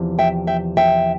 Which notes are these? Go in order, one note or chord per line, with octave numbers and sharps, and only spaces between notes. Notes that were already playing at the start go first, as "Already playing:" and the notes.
Already playing: E2 C3 F3
E5 G5
E5 G5
E5 G5